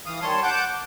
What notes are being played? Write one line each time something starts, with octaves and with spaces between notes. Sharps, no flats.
E3 F5 D#6
D#3 G3 C#5 A5 C6
F#5 A5 D6 G6
D6